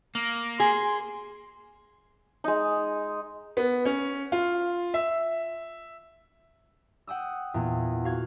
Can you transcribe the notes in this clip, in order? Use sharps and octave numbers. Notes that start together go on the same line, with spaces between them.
A#3
G#4 C6
G#3 D#4
B3
C#4
F4
E5
F#5 G5 D#6 E6
E2 A#2
F#4 F5 G#6